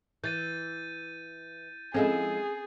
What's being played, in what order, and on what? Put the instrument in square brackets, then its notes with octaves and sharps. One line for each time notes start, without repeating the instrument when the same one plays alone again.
[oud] E3 [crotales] G6 A6 D#7
[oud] F3 G#3 E4 [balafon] C4 C#4 A4 [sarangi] G#4